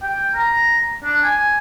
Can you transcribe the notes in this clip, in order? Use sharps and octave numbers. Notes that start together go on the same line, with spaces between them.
G5
A#5
D4
G#5